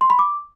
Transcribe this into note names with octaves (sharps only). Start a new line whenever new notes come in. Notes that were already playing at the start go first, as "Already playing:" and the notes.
C6
B5
D6